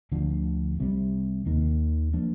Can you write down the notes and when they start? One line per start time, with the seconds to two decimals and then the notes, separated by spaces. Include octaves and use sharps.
0.12 D2 D3 F3
0.79 C2 C3 G3
1.46 D#2 D#3 A#3
2.13 F3 A#3 D4